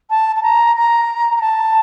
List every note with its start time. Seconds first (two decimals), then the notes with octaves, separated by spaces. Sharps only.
0.10 A5
0.36 A5
0.43 A#5
0.76 A#5
1.37 A#5
1.41 A5